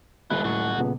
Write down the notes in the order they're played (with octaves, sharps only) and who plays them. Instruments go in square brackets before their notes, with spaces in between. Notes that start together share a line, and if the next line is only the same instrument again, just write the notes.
[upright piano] D#1 C#2 [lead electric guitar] F3 E4 [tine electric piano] F#6
[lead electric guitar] F#2 F#4 [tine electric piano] A2
[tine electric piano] A#2 C#3 B3